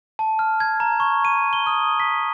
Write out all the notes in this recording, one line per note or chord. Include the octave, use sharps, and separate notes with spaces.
A5
F6
G#6
A#5
C#6
D#7
G7
D#6
B6